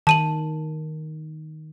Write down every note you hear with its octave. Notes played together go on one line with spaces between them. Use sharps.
D#3 A5 D#7 F#7